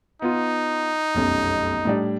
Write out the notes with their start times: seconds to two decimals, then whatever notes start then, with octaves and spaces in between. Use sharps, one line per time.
0.22 B3 D#4 F4
1.15 F1 B1 F#2
1.85 A2 G3 D4